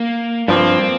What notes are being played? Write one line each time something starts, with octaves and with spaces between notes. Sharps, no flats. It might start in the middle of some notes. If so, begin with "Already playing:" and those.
Already playing: A#3
G2 F3 A#3 C4